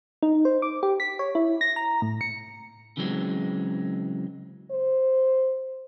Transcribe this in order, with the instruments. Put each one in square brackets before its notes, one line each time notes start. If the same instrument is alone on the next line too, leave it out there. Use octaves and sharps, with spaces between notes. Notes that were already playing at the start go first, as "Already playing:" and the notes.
[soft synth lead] D#4
C5
D6
G4
B6
C#5
E4
A#6
A#5
A2
C#7
[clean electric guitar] C#3 E3 F#3 G#3 C4
[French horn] C5